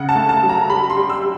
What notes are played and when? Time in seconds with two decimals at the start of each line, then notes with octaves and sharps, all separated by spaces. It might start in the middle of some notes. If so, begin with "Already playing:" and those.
Already playing: C#3 F#5
0.09 A5
0.15 A3
0.29 A5
0.43 F#3
0.49 A#5
0.70 G3 B5
0.90 C6
0.97 G3
1.09 E6